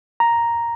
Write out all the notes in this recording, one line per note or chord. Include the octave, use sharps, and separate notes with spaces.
A#5